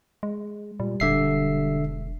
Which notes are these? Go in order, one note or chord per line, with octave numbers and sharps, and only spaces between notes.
G#3
A#2 G3
E1 D3 E5 C7